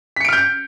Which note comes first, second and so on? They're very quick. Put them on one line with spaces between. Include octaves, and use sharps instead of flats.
B6 C#7 D7 F6 G6